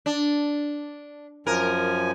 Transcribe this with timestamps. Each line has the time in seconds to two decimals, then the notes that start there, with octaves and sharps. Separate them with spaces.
0.06 D4
1.47 F#2 F3 A#4 G#5